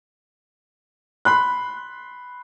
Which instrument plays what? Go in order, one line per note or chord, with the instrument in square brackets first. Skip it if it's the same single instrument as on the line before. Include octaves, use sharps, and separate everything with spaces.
[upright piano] B5 C6 F#6